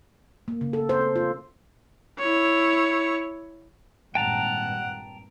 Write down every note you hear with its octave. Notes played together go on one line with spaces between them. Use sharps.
A#3
C#3
A4
C5
A4
F4
E4 C#5
G#1 G2 A#2 F#5 G5 A5 A#5